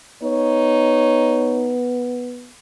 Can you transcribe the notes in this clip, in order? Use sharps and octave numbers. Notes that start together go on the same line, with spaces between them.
B3 D#4 C#5